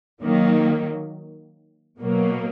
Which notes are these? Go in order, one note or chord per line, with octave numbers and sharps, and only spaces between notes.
D#3 F#3 A#3
B2 F#3 A#3